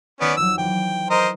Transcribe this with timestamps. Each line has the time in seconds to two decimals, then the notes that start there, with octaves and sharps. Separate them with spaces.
0.21 D#3 B3 C#4 D5 D6
0.37 F2 F#3 E6
0.58 E3 G5
1.10 A#4 C5 D#5